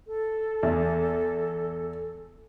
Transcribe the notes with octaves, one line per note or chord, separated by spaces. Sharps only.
A4
E2